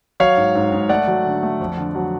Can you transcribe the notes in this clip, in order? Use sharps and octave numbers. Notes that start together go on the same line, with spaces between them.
F#3 C#5 F5
G#2
G#2
G#2
A3 D5 F#5
F#3
D3
A3
F2
D3
F#3